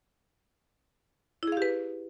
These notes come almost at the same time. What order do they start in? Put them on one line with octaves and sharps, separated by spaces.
E4 G#4 F5 G4 B4